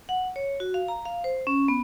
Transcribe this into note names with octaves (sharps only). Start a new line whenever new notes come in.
F#5
C#5
F#4
F5
A#5
F5
C5
C#4
B3